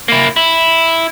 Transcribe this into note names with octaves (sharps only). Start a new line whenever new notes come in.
A#3 E4
E4